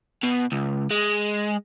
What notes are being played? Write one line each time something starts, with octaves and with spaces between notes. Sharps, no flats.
B2
C#2
G#3